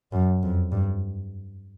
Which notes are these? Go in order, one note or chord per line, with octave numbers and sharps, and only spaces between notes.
F#2
F2
G2